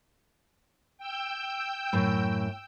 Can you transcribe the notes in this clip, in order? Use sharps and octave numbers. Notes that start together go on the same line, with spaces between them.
G5 E6 G6
F#2 A2